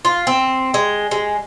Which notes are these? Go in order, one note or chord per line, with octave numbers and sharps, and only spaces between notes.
F4
C4
G#3
G#3